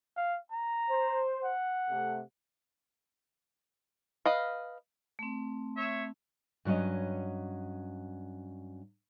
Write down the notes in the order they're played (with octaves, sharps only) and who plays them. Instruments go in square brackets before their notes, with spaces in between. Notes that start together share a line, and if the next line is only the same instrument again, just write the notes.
[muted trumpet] F5
A#5
[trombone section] C5
[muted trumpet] F#5
[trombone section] C3 A3
[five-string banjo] B4 D#5 F5
[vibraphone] A3 C4
[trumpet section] C#5 E5
[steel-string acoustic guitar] G2 F#3 C#4 D#5